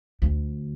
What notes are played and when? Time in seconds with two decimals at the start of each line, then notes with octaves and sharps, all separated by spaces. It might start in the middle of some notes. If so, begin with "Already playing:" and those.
0.22 D2